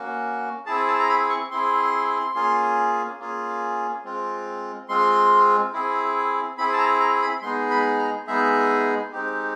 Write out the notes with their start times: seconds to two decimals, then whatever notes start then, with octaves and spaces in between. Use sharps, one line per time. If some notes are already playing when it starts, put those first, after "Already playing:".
Already playing: A#3 C#4 F#4
0.66 C4 E4 G#4 A5
0.87 A5
0.99 A#5
1.09 B5
1.30 C#6
1.51 C4 E4 G#4 C6
2.35 A#3 C#4 F4 G#4
3.19 A#3 C#4 F4 G#4
4.04 G#3 C4 F4
4.89 G#3 C4 F4 C6
5.73 C4 E4 G#4
6.58 C4 E4 G#4 B5
6.73 A5
6.79 A#5
7.00 A#5
7.22 B5
7.42 G#3 B3 D#4 G#4 C6
7.70 B5
7.99 A#5
8.27 G#3 B3 D#4 G#4 E5
9.12 G#3 C4 D#4 G4